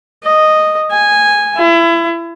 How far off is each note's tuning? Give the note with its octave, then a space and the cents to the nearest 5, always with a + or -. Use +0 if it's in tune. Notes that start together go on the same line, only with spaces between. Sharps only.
D#5 -5
G#5 -10
E4 +30